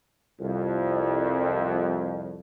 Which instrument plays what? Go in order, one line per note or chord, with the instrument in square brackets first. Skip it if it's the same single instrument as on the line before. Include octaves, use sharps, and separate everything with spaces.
[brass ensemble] C2 F2